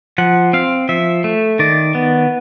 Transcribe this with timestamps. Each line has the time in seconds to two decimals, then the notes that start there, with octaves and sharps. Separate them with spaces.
0.18 F3 F#5
0.53 C4 F5
0.89 F3 E5
1.24 A3
1.59 D#3 D5
1.95 B3